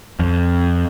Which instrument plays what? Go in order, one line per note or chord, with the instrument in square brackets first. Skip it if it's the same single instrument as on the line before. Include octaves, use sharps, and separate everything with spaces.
[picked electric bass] F2